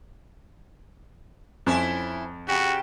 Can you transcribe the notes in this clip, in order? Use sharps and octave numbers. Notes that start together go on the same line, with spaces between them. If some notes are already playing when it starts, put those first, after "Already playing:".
F2 C#4 E4 C5
C#3 F#4 G4